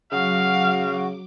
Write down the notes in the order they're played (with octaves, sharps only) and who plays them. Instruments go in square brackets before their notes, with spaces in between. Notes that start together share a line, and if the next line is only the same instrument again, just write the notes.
[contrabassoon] C#3 [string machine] F#3 D6 [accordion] F#4 [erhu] F5